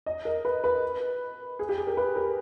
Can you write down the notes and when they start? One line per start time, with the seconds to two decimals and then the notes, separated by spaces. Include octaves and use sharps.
0.06 D#5
0.25 A#4
0.45 B4
0.64 B4
1.59 G#4
1.69 G4
1.78 G#4
1.87 A#4
1.97 B4
2.16 A#4